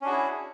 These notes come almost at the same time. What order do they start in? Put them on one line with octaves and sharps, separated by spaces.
C#4 D4 F#4 G#4 E4